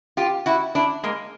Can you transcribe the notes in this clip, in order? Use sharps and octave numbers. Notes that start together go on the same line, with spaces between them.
F4 G4
E4 F#4
D4 E4
G#3 A#3